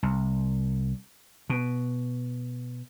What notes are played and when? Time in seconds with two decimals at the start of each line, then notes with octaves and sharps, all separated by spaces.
0.03 C2
1.50 B2